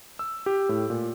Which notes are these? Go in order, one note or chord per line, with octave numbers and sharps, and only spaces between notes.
E6
G4
A2
A#2